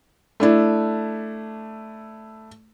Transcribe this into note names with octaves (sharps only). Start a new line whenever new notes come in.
A3 D4 E4